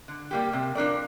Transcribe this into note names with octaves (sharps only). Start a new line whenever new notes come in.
D3
G3 A#3 G4
C3
F3 D4 A#4 D5